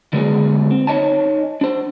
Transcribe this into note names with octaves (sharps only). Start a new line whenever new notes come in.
D3 G#3 A#3 B3 F#4 G#4
C4
D#4 C#5 D#5 G#5 A5
D4 C5